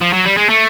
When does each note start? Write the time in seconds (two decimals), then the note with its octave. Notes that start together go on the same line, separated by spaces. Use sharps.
0.01 F3
0.13 F#3
0.26 G3
0.38 G#3
0.50 A3